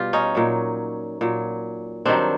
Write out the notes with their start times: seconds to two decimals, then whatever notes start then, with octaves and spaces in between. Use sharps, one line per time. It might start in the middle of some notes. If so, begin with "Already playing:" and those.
Already playing: B2 G3 F4 G4
0.13 C#4 D#4
0.35 A#2 F#3
1.21 A#2 F#3
2.05 G2 D#3 F#3 C4 D4